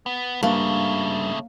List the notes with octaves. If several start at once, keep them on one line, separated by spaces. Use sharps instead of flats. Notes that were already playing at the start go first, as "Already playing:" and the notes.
B3
G2 C#3 A3 A#3